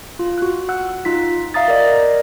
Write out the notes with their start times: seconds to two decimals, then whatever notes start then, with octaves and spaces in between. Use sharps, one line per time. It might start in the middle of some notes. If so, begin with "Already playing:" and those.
0.19 F4
0.38 F#4 F#6
0.69 F#5 E6 F#6
1.05 D#4 F4 B6
1.54 E5 F5 A#5 D#6 A6
1.68 A#4 D5 D#5